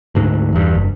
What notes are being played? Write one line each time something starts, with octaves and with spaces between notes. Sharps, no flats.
D2 G#2 D4
E2 G2
F#1